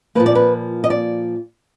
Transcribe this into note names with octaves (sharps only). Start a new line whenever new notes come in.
A#2 F3 A#3 B4
D5
B4
D#5
D5